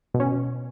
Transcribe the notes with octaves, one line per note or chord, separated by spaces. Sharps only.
B2
C#4
B2